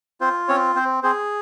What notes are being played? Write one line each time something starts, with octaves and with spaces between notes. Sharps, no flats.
C4 F4 C5
C4 C#4 C#5
C4 C5
C4 G#4 C5